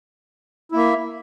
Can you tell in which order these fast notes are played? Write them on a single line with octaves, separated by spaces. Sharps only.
E4 A#3 E5